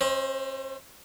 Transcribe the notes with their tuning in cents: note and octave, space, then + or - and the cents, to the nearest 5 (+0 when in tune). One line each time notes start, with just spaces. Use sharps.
C#4 -45 C5 +0 D#5 +30